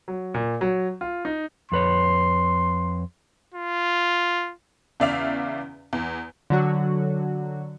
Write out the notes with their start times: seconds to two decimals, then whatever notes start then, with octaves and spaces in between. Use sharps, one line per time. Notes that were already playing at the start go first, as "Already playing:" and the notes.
0.08 F#3
0.34 A#2
0.61 F#3
1.01 F4
1.25 D#4
1.72 F2 B4 C#5 C6
3.54 F4
5.00 E2 C#3 D5 E5 F5 F7
5.93 E2
6.50 D3 F#3 F#4